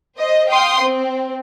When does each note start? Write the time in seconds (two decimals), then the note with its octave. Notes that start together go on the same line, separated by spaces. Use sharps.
0.19 C5 D#5
0.51 F5 G5 C6 D#6
0.82 C4